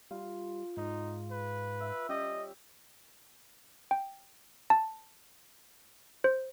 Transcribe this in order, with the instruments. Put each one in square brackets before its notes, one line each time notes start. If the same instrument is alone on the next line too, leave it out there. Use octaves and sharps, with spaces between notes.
[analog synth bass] G3 [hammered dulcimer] F4
[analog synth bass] G#2 [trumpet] D#4
[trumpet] B4
[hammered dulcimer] E5
[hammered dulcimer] G3 G4 [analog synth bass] C#4 [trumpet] D#5
[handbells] G5
A5
C5